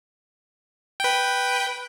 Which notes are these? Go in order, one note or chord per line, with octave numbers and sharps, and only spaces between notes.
B4 G5